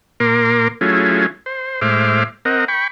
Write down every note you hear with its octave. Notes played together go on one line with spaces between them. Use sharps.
A#2 A#3 A#4 C6 D6
F#3 A3 C#4 E4 F4 G#4
C5
A2 G#3 C5 E5 D6 F6
C4 A#4 D#5 F#5
G5 B5 C#6